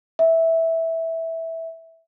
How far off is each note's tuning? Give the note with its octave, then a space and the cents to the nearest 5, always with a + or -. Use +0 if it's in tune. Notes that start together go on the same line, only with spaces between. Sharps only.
E5 -10